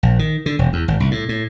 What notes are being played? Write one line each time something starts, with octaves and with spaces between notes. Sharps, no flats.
A#1
D#3
D3
E1
E2
G#1
C2
A2
A2